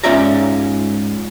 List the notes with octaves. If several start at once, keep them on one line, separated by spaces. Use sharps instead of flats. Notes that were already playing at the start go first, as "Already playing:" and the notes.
G#2 C#4 F4 D5 E5 A#5